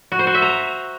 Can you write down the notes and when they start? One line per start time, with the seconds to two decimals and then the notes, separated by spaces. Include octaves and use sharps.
0.12 F#4
0.19 C5
0.27 F#4
0.34 E5
0.42 A#5